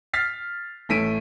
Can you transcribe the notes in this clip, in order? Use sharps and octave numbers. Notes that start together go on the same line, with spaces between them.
F6 A6 B6 C7
A1 A3 B6 D7 D#7